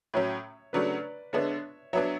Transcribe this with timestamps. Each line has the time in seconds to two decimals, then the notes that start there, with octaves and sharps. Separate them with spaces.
0.14 A2 F#3 C#4 C#5 E5
0.73 C#3 F#3 A3 D4 B4 D5
1.33 D3 G#3 B3 D4 C#5 E5
1.93 F#3 B3 D4 C#5 E5